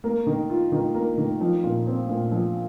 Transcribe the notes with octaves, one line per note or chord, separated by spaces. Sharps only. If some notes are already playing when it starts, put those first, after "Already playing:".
A#3
D#3
F4
D#3
A#3
D#3
F3
A#2
C4
A#2
F3